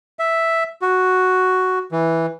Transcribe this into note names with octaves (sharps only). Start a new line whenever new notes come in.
E5
F#4
E3